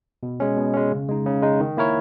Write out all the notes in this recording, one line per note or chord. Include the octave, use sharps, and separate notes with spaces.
B2
G#3 C#4
B2
G#3 C#4
C#3
G#3 D#4
C#3
G#3 D#4
D#3
A#3 E4 A#4 C#5